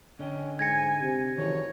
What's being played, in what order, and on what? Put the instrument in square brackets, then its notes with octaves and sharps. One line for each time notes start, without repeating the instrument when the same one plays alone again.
[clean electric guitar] D3 D#5 G5 [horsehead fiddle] C#4
[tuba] G#2 [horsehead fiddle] G#5 [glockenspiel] G#6 A#6 C#7
[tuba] C3
[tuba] F#1 [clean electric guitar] D#3 E3 A4 [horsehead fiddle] C#5